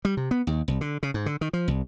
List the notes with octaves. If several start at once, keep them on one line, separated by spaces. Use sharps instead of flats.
G3
C3
B3
D#2
C2
D3
C#3
G#2
D3
D#3
F3
C2